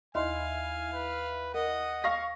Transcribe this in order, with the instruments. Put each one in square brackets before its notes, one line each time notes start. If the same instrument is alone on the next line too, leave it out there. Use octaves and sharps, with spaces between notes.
[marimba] D#2 D#5 C6 [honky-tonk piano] E4 [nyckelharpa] F5 [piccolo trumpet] G#5
[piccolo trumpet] B4
[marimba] A#4 [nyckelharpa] D#5 [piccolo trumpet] F#5
[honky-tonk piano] F5 C#6 A#6